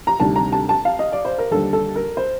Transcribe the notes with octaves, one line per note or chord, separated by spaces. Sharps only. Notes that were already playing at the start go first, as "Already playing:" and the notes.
A#5
D2 C3 D#3 G3 A5
A#5
A5
A5
F5
D#5
D5
C5
A#4
D#2 D3 G3 A4
A4
A#4
C5